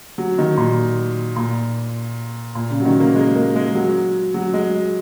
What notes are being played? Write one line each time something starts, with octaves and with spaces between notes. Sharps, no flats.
F#3
D#3
A#2
A#2
A#2
C#3
F#3
D#3
A#3
G#3
A#3
G#3
F#3
F#3
G#3